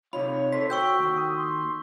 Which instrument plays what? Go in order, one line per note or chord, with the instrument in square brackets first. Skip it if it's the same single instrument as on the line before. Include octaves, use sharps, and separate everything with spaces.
[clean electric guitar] C3 D#4 F4 [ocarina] C#5 [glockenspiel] B5
[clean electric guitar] A4 C5 [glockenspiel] B6
[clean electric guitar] F#4 [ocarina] G5 [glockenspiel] C#6 E6 G6
[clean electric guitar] D#2 F#4
[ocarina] D#6
C6